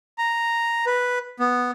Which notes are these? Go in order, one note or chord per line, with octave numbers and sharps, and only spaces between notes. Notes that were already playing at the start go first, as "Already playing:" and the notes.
A#5
B4
B3